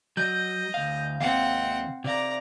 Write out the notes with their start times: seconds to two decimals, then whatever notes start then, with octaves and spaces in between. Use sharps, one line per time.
0.17 F#3 D#5 G6
0.74 D2 F5
1.21 D#2 C3 C4 F5 F#5
2.04 C3 D5 F5 A#5